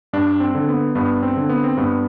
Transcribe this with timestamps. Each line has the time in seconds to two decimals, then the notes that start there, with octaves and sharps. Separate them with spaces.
0.13 G2 D4
0.40 C4
0.55 D3
0.68 B3
0.95 G2 B3
1.23 C4
1.37 D3
1.49 B3
1.64 C4
1.77 G2 B3